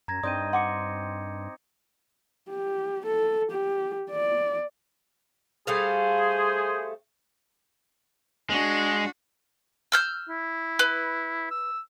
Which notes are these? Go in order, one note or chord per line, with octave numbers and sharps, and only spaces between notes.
F#2 A#5 G#6 A#6
G2 C4 D#4 D5 G5 D#6 G6 D#7
F#5 C6 D6 C#7
G4
A4
G4
D5
G3 A3 G#4 C5 F5
G#3 D4 F#4
E6 F6 G6
E4
B4
E6